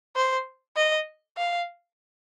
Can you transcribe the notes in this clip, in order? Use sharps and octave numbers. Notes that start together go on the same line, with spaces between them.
C5
D#5
F5